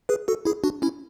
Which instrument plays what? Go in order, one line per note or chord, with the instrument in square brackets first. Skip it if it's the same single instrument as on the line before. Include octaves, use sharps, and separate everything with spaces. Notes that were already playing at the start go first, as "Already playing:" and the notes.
[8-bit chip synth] G#4 B4
F#4 A4
E4 G#4
D4 F#4
C#4 E4